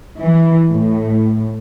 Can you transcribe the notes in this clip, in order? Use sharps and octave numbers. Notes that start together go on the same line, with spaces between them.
E3
A2